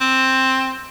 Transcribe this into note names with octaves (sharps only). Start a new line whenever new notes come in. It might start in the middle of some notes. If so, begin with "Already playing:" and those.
C4